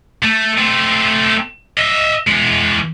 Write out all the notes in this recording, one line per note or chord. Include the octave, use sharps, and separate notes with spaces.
A3
A3 C4
D#5 E5
E3 G#3